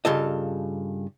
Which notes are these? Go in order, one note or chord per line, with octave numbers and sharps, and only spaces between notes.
G2 C#3 F4 A4 D#5